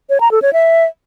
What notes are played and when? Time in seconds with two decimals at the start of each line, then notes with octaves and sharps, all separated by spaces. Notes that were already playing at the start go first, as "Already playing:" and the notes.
0.10 C#5
0.20 A#5
0.31 A4
0.42 C#5
0.53 E5